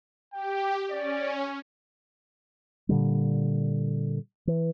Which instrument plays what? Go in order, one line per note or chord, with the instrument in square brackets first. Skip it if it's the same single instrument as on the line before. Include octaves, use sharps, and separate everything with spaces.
[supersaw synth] G4 [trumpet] G5
[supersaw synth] C#4 [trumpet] D5
[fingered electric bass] A#2 D3 G3
E3